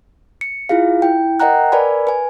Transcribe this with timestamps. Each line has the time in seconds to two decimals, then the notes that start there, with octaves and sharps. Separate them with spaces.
0.41 C#7
0.69 E4 F4 G#4 F5
1.02 E4 G5
1.40 A#4 D#5 F#5 G5 A#5 F#6
1.72 A#4 B4 D5 G#5 B5
2.07 B4 G#5